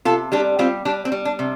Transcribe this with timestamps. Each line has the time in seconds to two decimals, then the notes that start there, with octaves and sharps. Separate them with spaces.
0.05 C3 F4 A4
0.32 G3 D4 G4
0.59 G3 C4 F4
0.85 G3 D4
1.05 C4
1.12 G3
1.25 D4
1.39 C3